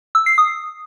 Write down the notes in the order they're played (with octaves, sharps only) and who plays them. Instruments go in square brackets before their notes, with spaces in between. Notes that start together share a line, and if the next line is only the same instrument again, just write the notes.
[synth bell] E6
C7
D#6